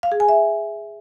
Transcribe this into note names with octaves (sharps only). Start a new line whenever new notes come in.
F5
G#4
G#5
E5